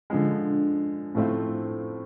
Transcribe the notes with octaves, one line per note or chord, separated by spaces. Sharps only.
D3 F3 G#3
A2 F3 A3 C4 F4